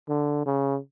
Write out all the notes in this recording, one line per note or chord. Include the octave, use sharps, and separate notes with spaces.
D3
C#3